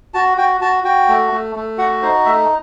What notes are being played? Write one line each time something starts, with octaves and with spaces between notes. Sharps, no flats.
F#4 A5
F#4 G5
F#4 A5
F#4 G5
A3
A3
A3
F#4 F#5
D#4 C5
A3 E5